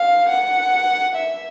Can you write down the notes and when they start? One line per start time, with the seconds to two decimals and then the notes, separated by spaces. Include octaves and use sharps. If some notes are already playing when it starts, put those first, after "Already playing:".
Already playing: F5
0.29 F#5
1.15 E5